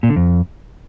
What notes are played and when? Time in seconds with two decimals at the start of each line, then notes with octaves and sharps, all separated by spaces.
0.03 A#2
0.10 D3
0.16 F2